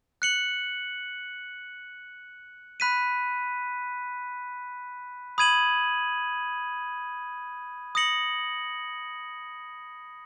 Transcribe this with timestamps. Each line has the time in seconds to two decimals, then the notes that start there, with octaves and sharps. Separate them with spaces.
0.22 F#6 C#7 F#7
2.80 B5 F#6 B6 D#7
5.38 B5 D#6 G#6 D#7 F#7
7.95 D#6 A#6 C#7 F#7